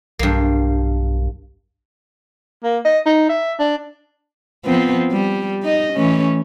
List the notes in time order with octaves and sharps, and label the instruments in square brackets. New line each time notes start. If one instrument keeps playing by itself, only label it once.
[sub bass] B1 [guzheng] G2 A#3
[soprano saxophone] A#3
D#5
D#4
E5
D4
[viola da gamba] F3 B3 C4
G3
D#4 D#5
E3 A3 C#4